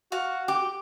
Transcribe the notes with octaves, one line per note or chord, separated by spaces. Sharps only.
F#4 F5 C#6
G4 D6